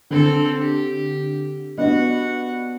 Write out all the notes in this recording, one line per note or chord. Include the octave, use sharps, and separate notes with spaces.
D3 C4 A4
G4
B3 D4 F#4 D#5 F#5